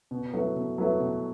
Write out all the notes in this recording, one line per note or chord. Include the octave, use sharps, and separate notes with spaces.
B2
F#3 A3 E4 B4
B2
F#3 A3 E4 B4
B2